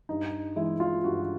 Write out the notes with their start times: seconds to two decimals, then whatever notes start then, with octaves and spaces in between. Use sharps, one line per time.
0.09 G2 D#4
0.56 E3 G#3 E4
0.80 F4
1.04 G2 F#4